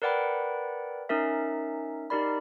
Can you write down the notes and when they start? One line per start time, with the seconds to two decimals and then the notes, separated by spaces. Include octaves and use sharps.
0.02 A#4 B4 D5 F#5 G5 B5
1.09 C#4 D#4 A#4 E5
2.10 D#4 G4 A#4 D5 B5